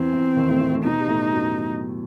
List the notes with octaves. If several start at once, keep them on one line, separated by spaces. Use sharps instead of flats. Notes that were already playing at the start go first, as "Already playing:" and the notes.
Already playing: E2 E3 C4
E2 E3
D#2 D#3
A2 A3
A2 A3
A2 A3
B2 B3 D#4
G3
A2 A3
F#2 F#3